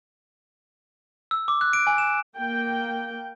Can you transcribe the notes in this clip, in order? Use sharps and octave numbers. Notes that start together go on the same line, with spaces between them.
E6
D6
F#6
D7
G#5
E7
A#3 G5